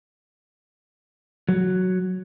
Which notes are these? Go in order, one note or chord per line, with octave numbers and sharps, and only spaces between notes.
F#3